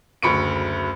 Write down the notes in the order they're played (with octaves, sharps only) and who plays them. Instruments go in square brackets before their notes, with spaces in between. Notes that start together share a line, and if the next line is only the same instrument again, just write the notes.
[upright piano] F#1 D2 B5 C#6 C#7 D7